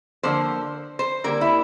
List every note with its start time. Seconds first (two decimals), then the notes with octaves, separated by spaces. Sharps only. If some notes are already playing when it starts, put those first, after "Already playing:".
0.23 D3 F3 A#3 C5
0.99 C5
1.24 D3 G3 A#3 A#4
1.41 E4